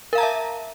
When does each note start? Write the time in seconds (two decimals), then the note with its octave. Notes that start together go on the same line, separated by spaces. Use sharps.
0.13 A#4
0.15 F5
0.18 A#5
0.20 A5
0.23 E5